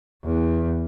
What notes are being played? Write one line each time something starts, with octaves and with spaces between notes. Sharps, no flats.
E2